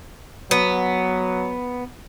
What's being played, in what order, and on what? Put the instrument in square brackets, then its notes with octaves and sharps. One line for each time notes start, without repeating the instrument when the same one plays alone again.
[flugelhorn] F#3 [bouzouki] B3